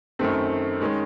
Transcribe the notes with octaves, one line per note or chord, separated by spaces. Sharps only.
F#2 D#3 A3 C4
D#3 G#3 C#4